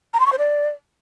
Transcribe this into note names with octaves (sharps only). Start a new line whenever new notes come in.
A#5
C6
C#6
C5
D5